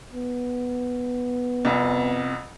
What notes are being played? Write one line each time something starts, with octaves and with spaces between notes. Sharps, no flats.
B3
C2 F2